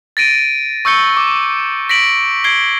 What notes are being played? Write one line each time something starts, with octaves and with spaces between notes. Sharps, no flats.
A6 A#6 D7 D#7
C#6 E6 G6 C#7 G7
D6
A#6 B6 D7 F#7
G#6 C7 D7 G7